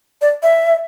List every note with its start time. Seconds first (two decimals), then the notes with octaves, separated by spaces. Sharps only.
0.21 D5
0.43 E5